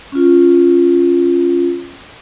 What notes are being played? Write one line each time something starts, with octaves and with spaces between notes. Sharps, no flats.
C#4 F4